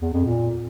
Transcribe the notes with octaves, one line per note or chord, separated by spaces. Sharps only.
E2
F2
A#2